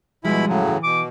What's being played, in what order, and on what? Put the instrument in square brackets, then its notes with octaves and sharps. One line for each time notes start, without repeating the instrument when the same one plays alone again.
[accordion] B2 E4 B5 [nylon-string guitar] F3 G3 G#3
[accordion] A2 C#3 F#3
[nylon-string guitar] E3
[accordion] B2 [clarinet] D6